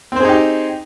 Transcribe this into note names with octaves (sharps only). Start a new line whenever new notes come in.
C4 D#4 G4 G#4 C5